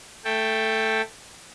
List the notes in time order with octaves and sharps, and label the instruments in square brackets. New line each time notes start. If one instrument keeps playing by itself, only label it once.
[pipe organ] A3 A4 G5